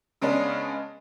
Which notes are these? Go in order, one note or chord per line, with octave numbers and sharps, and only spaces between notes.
C#3 G#3 B3 C#4 D4 D#5